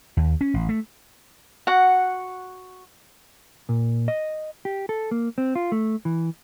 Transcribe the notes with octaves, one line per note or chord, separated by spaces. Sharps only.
D#2
C#4
A1
A3
F#4 F#5
A#2
D#5
G4
A4
A#3
C4
F4
A3
E3